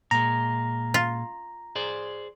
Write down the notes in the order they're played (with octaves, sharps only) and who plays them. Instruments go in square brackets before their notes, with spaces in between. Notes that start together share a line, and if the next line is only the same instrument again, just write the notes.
[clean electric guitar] A#2 G#3 [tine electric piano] A#5
[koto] F4
[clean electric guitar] G#4 C5 D5